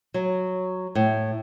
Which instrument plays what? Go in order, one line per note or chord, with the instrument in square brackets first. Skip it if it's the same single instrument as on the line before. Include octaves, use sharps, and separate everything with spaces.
[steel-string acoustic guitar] F#3
A2